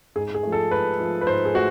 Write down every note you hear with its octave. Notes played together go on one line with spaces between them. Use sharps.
G#2 G#4
G#4
F3 A3
A4
G#2 B4
F3 A3
B4
G#2 C5
G#4
A3 F#4